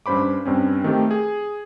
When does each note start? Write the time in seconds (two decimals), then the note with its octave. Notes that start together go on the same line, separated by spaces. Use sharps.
0.06 G2 C#4 C5 B5 D6
0.46 G2 C4 C#4
0.84 D#3 A3 C4 G4 A4
1.11 G#4